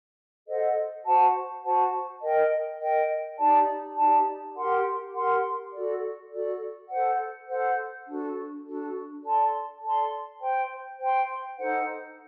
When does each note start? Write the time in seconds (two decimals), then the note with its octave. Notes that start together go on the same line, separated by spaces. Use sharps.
0.46 A4 C5 D#5 F#5
1.04 F#4 C5 F#5 A5
1.63 F#4 C5 F#5 A5
2.21 A#4 D#5 G5
2.79 A#4 D#5 G5
3.38 D#4 G4 D5 A5
3.97 D#4 G4 D5 A5
4.55 G4 A#4 F#5 C6
5.13 G4 A#4 F#5 C6
5.73 F#4 A4 D5
6.31 F#4 A4 D5
6.89 A4 C5 F#5
7.48 A4 C5 F#5
8.06 D4 F#4 A4
8.65 D4 F#4 A4
9.23 A4 D5 A5 C6
9.82 A4 D5 A5 C6
10.40 C5 G5 C6
10.99 C5 G5 C6
11.57 D#4 A4 C5 F#5